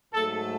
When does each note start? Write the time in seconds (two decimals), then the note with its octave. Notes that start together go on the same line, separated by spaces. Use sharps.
0.13 G#2 F#3 A3 A4